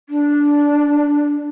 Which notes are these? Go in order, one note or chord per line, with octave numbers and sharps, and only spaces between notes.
D4